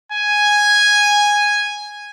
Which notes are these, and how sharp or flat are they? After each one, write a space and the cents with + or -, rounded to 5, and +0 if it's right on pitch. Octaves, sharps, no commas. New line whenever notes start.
G#5 -5